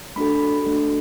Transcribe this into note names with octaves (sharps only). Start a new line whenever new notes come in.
A3 D4 F#4 A4 B5
A3 D4 F#4 A4